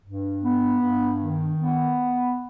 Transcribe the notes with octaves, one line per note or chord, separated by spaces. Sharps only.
G2
B3
G2
D#3
B3